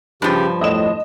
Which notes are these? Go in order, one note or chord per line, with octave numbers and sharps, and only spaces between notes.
G2 C#3 F3 G4
E2 A2 D4 D#5 D#6 E7